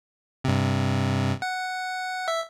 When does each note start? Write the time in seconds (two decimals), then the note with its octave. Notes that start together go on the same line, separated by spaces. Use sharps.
0.44 G2 C3
1.42 F#5
2.28 E5